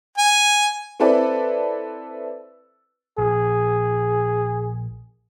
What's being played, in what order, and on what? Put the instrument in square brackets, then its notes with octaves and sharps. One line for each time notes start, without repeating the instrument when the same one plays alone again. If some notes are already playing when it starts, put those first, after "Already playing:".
[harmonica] G#5
[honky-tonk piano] C4 E4 A4 B4 D5
[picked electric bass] A#1 [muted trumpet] G#4